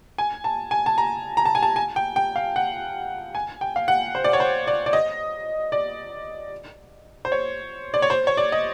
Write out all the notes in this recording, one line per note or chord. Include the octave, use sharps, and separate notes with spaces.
G#5
A5
G#5
A5
A#5
A#5
A5
G#5
A5
G#5
G5
G5
F5
F#5
G#5
G5
F5
F#5
C5
D5
C#5
C5
D5
D5
D#5
D5
C5
C#5
D5
C#5
C5
C#5
D5
D#5